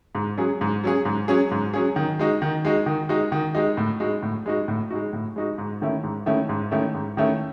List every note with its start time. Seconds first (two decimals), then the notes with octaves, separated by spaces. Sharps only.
0.15 G#2
0.38 F#3 C#4 G#4
0.61 G#2
0.84 F#3 C#4 G#4
1.05 G#2
1.28 F#3 C#4 G#4
1.51 G#2
1.74 F#3 C#4 G#4
1.96 D#3
2.19 G#3 D#4 F#4
2.42 D#3
2.65 G#3 D#4 F#4
2.86 D#3
3.09 G#3 D#4 F#4
3.32 D#3
3.55 G#3 D#4 F#4
3.77 A2
4.00 G#3 D#4 F#4
4.23 A2
4.46 G#3 D#4 F#4
4.68 A2
4.91 G#3 D#4 F#4
5.13 A2
5.36 G#3 D#4 F#4
5.58 G#2
5.81 D#3 A3 C#4 E4
6.03 G#2
6.26 D#3 A3 C#4 E4
6.49 G#2
6.71 D#3 A3 C#4 E4
6.94 G#2
7.17 D#3 A3 C#4 E4